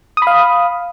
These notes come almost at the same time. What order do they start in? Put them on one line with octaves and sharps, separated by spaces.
D#6 B5 F5